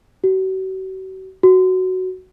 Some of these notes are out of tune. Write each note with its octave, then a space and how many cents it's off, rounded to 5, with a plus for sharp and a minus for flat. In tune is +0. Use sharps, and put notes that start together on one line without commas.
F#4 +40
F#4 +5